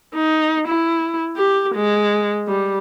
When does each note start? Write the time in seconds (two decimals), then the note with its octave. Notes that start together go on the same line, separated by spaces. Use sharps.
0.15 D#4
0.68 E4
1.37 G4
1.75 G#3
2.48 G3